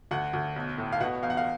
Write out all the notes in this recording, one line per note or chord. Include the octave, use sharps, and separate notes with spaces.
D2 F#5
D2
B1
A2
F5
B2 F#5
E2 F5
F#5
F5